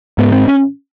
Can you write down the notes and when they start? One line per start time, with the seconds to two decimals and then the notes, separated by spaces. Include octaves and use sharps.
0.18 G#2 B3
0.32 C4
0.48 C#4